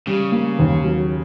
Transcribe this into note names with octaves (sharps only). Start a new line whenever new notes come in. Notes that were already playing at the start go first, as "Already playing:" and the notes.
C#3 G3
A#3
D#2
F#3